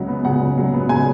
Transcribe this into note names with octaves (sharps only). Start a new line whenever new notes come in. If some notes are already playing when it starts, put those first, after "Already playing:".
Already playing: C#2 C#3 F#3
B3
C#3 F#5
C#2
F#3
B3
C#3 G#5